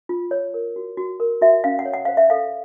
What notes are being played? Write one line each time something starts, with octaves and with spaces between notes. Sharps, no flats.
F4
C#5
A#4
F#4
F#4
A#4
F#4 E5
C#4 F5
F#5
C#5
F#5
C5 F5
E5
A4 F5